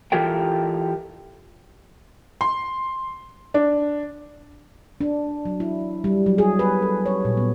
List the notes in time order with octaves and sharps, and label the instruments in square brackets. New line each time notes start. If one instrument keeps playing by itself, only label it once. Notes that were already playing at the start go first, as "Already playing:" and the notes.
[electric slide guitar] E3 F4 G4 A4 A#4 G5
[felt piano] C6
D4
[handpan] D4
F#3
E4
G3
F#3
G#4
B4
A4
C#5
A#2
B3